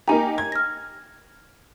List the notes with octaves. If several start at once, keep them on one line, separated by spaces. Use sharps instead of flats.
A#3 D#4 G4 G#5 A#5
G#6
F6 A#6